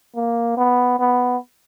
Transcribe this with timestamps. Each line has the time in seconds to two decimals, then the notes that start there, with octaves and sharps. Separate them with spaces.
0.16 A#3
0.57 B3
0.99 B3